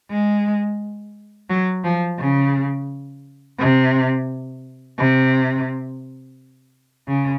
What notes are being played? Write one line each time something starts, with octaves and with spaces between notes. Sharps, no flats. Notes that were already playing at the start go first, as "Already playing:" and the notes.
G#3
F#3
F3
C#3
C3
C3
C#3